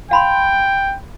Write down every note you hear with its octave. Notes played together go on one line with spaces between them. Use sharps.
F5 G5 B5 C6